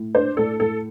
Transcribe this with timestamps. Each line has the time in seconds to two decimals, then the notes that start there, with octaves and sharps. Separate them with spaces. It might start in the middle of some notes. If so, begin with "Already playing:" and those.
Already playing: A2
0.15 D4 C5
0.37 A2 A4
0.60 A2 A4